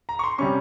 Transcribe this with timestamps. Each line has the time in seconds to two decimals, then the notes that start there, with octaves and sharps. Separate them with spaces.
0.09 A#5
0.19 C#6
0.24 C6
0.38 C3 G3 C#4 C#6